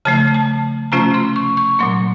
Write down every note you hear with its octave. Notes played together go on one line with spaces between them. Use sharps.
C#3 F3 A3 A5
A5
C3 F3 A3 C#4 F4 A#5
C6
C#6
C#6
A#2 F#3 A#3 C6